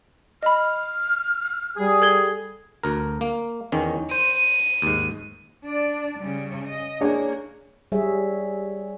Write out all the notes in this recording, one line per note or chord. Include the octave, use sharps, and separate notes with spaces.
D#5 B5 F6
G3 G#4
A4 G#6 G7
D2 A#4
A#3
E2 D#3 C#4
C5 D#7
D#2 G#2
D4 D5
C#3 G3
D#5
A#3 D4 G#4 C#5
G3 G#4 C#5 E5